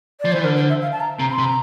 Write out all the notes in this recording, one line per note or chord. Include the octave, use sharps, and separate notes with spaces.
F3 D5
E3 C5
D3 A#4
C5
E5
F5
A5
A#5
C3 A#5
C6
C3
A#5